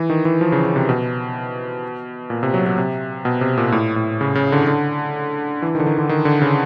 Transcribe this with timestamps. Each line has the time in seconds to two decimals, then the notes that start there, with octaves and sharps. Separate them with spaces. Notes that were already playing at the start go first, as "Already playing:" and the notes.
Already playing: E3
0.10 D#3
0.25 E3
0.41 F3
0.52 C#3
0.65 C#3
0.76 C3
0.89 B2
2.30 A#2
2.43 C3
2.54 F#3
2.66 F#3
2.78 C3
3.25 B2
3.41 C3
3.57 A#2
3.72 A2
3.96 A2
4.21 C#3
4.35 C#3
4.52 D3
4.67 D3
5.62 E3
5.75 D#3
5.80 D3
5.87 D#3
5.98 D3
6.09 D#3
6.25 D3
6.42 C#3